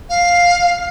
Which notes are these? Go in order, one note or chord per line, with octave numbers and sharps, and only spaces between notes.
F5